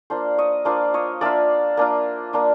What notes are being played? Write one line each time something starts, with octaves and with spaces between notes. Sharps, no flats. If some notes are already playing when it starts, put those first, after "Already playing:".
A#3 D4 F4 C5 D5
C#5 D#5
A#3 D4 F4 C5 D5
C#5 D#5
A#3 D4 F4 D5 E5
A#3 D4 F4
A#3 D4 F4